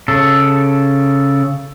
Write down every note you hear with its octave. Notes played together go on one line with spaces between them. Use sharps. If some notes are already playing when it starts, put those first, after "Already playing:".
C#3 A4